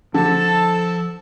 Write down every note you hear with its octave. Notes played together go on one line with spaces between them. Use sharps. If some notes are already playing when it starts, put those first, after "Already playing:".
D3 F3 A4 A5